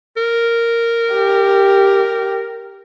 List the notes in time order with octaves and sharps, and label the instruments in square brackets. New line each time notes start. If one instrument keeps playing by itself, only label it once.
[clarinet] A#4
[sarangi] G4